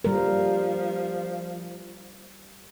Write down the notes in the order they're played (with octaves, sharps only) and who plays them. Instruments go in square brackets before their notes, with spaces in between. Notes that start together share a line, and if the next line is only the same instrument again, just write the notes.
[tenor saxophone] F3 [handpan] G3 A#4